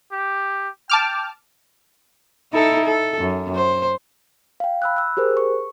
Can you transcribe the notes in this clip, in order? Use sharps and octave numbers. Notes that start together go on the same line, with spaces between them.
G4
G5 A5 D6 F6
D#4 E4 A4
A4
F#2
C5
F5 G5
B5 E6 F#6
E6 F#6
G4 G#4 A#4 C5
C#6